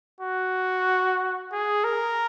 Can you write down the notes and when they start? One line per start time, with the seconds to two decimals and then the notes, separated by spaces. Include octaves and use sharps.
0.20 F#4
1.52 G#4
1.84 A#4